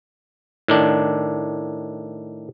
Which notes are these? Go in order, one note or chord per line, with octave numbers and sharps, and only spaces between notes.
A2 D#3 D4